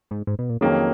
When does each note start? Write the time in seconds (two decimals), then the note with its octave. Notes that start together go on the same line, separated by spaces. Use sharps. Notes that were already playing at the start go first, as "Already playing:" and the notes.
0.11 G#2
0.27 G#2
0.39 B2
0.49 A#2
0.61 F2 D#3 F#3 A#3 C#4 G#4